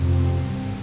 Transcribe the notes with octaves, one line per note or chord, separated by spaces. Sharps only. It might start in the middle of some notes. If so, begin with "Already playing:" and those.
Already playing: G1 F2 C3
C4
G#1 G2